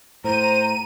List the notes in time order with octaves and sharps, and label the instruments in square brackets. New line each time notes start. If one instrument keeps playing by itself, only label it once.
[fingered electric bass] A2 [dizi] C5 [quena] A#5 [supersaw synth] D#7